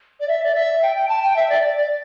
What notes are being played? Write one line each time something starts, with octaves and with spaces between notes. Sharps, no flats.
D5
E5
D5
E5
G5
G5
A5
G5
E5
D5
D5
D5